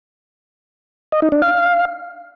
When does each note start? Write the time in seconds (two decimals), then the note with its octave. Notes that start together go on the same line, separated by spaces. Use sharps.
1.12 D#5
1.22 D#4
1.32 D4
1.42 F5